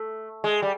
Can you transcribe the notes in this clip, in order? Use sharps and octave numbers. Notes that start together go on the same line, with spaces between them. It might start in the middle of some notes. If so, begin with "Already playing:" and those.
Already playing: A3
G#3
G3